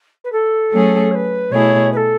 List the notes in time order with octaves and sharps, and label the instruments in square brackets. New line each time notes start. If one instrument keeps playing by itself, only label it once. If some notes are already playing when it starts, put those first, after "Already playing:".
[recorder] B4
A4
[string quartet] F#3 A3 C#4 G#4
[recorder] C#5
B4
[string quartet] B2 A3 E4 G#4 [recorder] C#5
[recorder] B4
A4